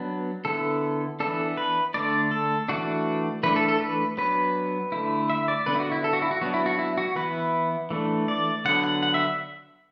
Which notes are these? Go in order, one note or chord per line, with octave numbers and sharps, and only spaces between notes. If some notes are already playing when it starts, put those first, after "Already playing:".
Already playing: F#3 B3 D4
D3 B3 E4 A4
E3 B3 D4 A4
B4
D3 A3 D4 D5
A4
E3 A3 D4 F#4
E3 A3 D4 B4
A4
A4
B4
F#3 B3 D4 B4
D3 A3 E4
E5
D5
D3 B3 D4 B4
E4
F#4
E4
A4
F#4
E4
F#4
F#3 B3 D4 F#4
E4
F#4
E4
F#4
E3 B3 E4 B4
E3 A3 D4
D5
D3 F#3 B3 D4 F#5
F#5
F#5
E5